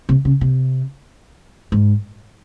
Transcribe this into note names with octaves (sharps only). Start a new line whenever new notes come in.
C3
C#3
C3
G#2